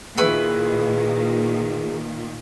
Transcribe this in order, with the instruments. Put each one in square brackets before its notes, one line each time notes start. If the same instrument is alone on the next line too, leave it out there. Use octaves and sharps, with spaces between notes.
[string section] A#2 D#3 [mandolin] E4 B4 C#6 [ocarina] G#4